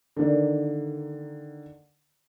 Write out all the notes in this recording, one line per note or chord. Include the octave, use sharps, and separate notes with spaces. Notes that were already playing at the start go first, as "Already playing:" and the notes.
D3 D#3 A#3 D5